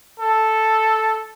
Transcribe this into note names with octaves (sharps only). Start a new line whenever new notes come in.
A4